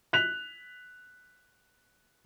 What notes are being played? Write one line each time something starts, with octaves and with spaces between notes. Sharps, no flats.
F#6 B6 F7